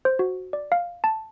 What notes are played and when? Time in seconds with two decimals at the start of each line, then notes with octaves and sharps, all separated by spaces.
0.05 C5
0.19 F#4
0.53 D5
0.72 F5
1.04 A5